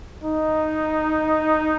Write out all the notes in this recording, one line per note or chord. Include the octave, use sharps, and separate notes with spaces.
D#4